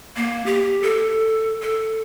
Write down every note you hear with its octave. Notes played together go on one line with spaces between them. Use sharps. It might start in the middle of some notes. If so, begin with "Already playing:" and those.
A#3
G4
A4
A4